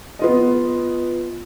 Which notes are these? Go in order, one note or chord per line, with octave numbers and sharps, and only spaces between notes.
B3 F4 D#5